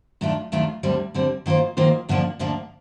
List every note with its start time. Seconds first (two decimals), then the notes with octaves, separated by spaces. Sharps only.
0.21 D#2 D#3 A3 D4 F4
0.52 D#2 D#3 A3 D4 F4
0.83 D2 D3 G3 C4
1.14 D2 D3 G3 C4
1.46 D#3 A#3 F4 C5
1.77 D#3 A#3 F4 C5
2.09 D2 D3 F3 A#3 D4
2.39 D2 D3 F3 A#3 D4